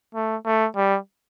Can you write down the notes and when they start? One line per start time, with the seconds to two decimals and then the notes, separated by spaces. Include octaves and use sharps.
0.15 A3
0.45 A3
0.76 G3